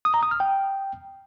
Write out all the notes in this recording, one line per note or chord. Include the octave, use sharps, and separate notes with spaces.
D#6
A#5
D#6
F6
G5